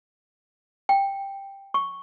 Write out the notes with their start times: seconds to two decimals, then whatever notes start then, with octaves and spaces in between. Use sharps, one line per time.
0.89 G5
1.74 C#6